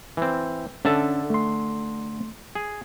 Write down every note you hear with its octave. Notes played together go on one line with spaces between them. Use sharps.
E3 C4
D3 C#4 A4 E5 A5
A3 C6
G#4